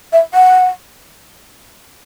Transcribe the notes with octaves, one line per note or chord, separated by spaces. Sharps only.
E5
F#5